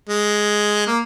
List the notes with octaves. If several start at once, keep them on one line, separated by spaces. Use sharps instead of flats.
G#3
A#3